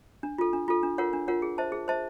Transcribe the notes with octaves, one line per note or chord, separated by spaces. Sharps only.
D4
F4 A4
D4
F4 A4
D4
F4 A#4 C#5 F#5
D4
F4 A#4 C#5 F#5
G#4
C5 E5 A5
G#4
C5 E5 A5